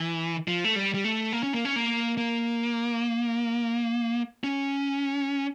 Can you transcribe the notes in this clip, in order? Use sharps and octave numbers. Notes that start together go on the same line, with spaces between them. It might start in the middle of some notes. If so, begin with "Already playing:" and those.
Already playing: E3
F3
A3
G3
G3
A3
A#3
C#4
A#3
C#4
A#3
A#3
C#4